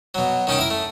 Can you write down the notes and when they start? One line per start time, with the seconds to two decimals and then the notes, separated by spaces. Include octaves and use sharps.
0.15 B2 F#3
0.47 D#3 C#4 D#4 G5
0.58 E4 A#4
0.70 A3